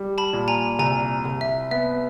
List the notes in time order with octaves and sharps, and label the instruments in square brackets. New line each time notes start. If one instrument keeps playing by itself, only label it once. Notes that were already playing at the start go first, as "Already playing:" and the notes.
Already playing: [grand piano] G3
[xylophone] A5 B5
[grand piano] A#2
[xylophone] G#5 A#5
[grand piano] C2 [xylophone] G#5 A#5
[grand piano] C2
[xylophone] E5
[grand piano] B3 [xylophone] E5